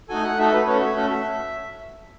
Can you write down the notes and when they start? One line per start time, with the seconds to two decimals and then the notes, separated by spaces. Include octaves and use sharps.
0.09 A3 D#4 F#4 A4 G#5
0.23 F#5
0.37 A3 D#4 F#4 A4 E5
0.53 B4
0.66 A3 C#4 F#4 A4 C#5
0.81 E5
0.95 A3 C#4 F#4 A4